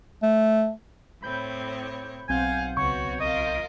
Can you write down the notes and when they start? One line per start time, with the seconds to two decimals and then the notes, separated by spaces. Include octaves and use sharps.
0.23 A3
1.22 A2 C4 C#5 B5 G6
2.29 B1 C4 F5 F#5 G#5 G6
2.77 C#2 B3 F#4 C#5 C#6
3.20 F4 A#4 D#5